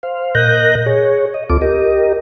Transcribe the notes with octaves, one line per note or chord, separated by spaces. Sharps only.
C5 F5
A#2 A#4 D#5 F#6 G6 A#6
G#4 C#5
D#5
D2 C4 F4 A4 D6
G4 A#4 D#5